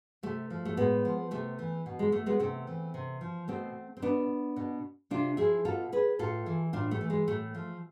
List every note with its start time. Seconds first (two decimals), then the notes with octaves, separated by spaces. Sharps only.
0.23 C3 A3
0.50 F3
0.65 A3
0.77 A2 G#3 B3
1.05 F3
1.31 C3 A3
1.59 E3
1.86 B2
1.99 G#3
2.12 A3
2.26 G#3 B3
2.40 C3 A3 C4
2.67 E3
2.94 C3
3.21 F3
3.48 B2 A3 C4
3.97 C4
4.02 B2 B3 D4
4.56 B2
5.11 C3 D4 F4
5.37 F3 E4 G#4
5.65 B2 F4 A4
5.92 G#4 B4
6.19 A2 F4 A4
6.46 E3
6.73 A2 D4 F4
6.91 A3
7.01 E3
7.10 G#3
7.27 A2 A3
7.55 F3